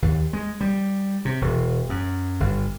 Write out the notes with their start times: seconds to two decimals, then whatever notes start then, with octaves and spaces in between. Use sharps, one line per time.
0.02 D#2
0.33 G#3
0.61 G3
1.25 C3
1.41 E1
1.89 F#2
2.40 G1